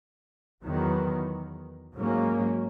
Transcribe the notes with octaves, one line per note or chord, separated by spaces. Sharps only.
E2 D#3 F#3 B3
G#2 F#3 A#3 C#4